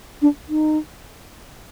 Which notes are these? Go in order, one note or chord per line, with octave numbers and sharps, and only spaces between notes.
D4
D#4